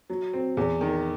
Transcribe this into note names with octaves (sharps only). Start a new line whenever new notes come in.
F#3
C4
E2
D#3